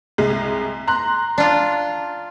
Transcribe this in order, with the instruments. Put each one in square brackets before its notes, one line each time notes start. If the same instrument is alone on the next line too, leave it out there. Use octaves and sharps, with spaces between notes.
[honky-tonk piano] C2 G#3
A#5 C6 F#6
[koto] D4 F4